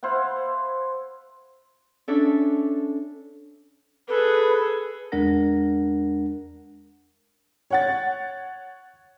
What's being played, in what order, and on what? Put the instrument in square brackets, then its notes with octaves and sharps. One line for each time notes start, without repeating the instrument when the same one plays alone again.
[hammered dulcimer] E4 C5 F5 F#5
[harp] C#4 D4 A4 E5
[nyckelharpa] G#4 A4 [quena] B4
[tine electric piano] E2 G#3 D4 A#4 F#5 A#6
[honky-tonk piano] C#5 F#5 A6